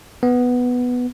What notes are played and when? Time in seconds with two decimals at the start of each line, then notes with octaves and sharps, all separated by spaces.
0.23 B3